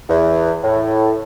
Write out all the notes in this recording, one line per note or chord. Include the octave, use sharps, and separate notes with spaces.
E2
A2